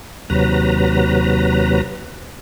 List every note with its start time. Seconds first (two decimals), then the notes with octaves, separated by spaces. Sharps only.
0.30 D#2 C3 F#3 B4 A#5